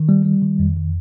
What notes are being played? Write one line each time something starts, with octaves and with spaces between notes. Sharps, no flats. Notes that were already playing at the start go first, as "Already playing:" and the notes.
Already playing: D#3
G3
G3
D#3
F2
D#3